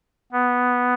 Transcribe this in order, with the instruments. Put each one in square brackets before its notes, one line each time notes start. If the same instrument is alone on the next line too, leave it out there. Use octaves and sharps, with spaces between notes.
[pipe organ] B3